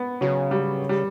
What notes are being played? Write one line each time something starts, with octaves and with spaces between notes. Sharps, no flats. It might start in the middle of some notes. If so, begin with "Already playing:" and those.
Already playing: B3
C#3 F#3
G3
G3